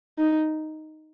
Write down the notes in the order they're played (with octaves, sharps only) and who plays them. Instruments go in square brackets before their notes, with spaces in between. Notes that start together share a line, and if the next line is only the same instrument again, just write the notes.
[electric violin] D#4